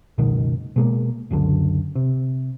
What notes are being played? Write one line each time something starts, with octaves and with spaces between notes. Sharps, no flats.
F#1 C#2 B2 D#3
B2 G#3 A#3
F#1 C#2 F#2 D3
C3